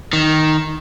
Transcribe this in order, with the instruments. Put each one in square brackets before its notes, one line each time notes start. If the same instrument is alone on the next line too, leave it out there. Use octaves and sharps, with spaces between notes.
[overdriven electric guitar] D#3